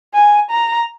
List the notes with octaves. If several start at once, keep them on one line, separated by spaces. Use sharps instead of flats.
G#5
A#5